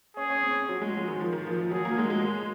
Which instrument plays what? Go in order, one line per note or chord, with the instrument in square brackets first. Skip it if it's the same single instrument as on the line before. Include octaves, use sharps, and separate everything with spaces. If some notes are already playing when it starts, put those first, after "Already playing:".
[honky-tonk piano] C#4 [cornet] G#4
[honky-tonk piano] C#4
C4
F#3
G#3
F3
D#3
F3
D#3
F3
F3
[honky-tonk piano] F#3 [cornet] G#4
[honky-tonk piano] A#3
G#3
G#3